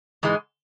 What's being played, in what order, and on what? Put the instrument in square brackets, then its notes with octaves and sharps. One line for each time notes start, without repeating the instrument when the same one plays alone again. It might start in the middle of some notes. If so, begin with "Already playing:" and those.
[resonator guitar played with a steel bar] G#2 E3 G#3